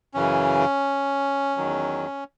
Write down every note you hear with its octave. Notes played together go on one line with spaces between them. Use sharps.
F#2 C#3 E3 C#4
E2 D#3 F#3